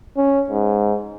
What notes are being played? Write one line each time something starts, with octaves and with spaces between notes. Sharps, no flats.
C#4
G#2